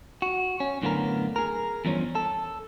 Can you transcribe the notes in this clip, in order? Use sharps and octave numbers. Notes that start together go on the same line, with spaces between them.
F#4
C#4
F#2 A2 D3 A#3 B3 A#4
G#4 A#4
E2 G2 F3 C#4
A4